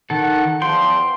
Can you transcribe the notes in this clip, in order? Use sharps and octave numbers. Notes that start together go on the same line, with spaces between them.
D#3 A4 F#5
E2 F3 G5 C6